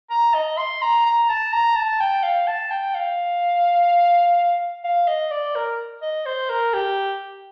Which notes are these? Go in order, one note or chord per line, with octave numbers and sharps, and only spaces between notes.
A#5
D#5
C6
A#5
A#5
A5
A#5
A5
G5
F5
A5
G5
F5
F5
D#5
D5
A#4
D#5
C5
A#4
G4